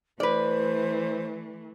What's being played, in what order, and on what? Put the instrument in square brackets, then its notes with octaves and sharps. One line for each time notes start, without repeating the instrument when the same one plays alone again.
[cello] E3 A3 [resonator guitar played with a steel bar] B4 D5 [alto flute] C5